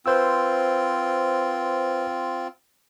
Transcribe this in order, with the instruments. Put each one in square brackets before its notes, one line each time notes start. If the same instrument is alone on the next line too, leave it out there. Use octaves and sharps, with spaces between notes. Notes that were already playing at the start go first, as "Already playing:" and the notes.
[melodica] C4 F4 [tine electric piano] B4 C5 E6